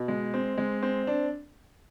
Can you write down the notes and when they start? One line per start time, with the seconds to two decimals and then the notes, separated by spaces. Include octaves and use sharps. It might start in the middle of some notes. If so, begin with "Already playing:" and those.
Already playing: B2
0.08 G#3
0.34 C4
0.58 G#3
0.82 C4
1.07 D4